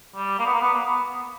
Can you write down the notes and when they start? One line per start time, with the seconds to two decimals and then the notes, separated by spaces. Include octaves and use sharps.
0.16 G3
0.39 A#3
0.46 B3
0.54 A#3
0.62 B3
0.74 A#3
0.85 B3